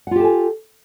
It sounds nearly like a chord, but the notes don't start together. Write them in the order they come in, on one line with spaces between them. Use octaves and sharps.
F#5 F4 G4 A4 G#5